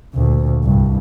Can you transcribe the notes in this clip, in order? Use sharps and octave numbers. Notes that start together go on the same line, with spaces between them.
D2 A#2
C2 G2